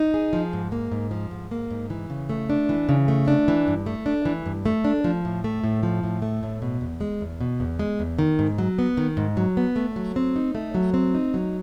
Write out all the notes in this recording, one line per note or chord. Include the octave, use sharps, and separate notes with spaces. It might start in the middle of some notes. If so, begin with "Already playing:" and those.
Already playing: D#4
G#4
F3
G#2
A#3
G#2
F3
G#2
A#3
G#2
E3
C#3
A3
D4
E3
C#3
A3
D4
E3
G2
A3
D4
E3
G2
A3
D4
F3
A2
A3
A2
F3
A2
A3
A2
B2
E2
G#3
E2
B2
E2
G#3
E2
D#3
G#2
F#3
B3
D#3
G#2
F#3
B3
A3
F#3
C4
D#4
A3
F#3
C4
D#4
F#3